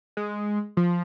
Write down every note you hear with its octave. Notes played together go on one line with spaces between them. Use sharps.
G#3
F3